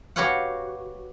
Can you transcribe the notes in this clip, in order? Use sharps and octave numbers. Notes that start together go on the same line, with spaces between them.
F#4 G4 B4 C#5 F5 F#5